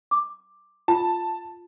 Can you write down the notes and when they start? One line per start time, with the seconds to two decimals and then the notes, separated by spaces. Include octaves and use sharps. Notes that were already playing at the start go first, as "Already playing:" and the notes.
0.11 D6
0.88 F4 A5